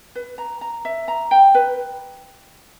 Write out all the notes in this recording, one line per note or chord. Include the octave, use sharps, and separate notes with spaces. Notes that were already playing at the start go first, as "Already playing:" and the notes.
B4
A#5
A#5
E5
A#5
G5
B4